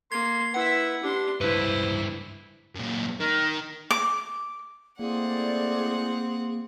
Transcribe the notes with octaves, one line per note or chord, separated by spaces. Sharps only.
A#3 C6 G#6
E4 B4 E5 F#5
D4 G4 C6
C#2 G2 E4 B4 C5
F#2 A#2
D#3 A#4
D6
A3 A#3 C4 E4 G#4 D5 F#5